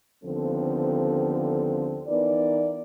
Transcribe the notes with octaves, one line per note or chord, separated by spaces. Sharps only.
D#2 D3 F3 B3 C4 A4
E3 B3 D#4 A#4 D5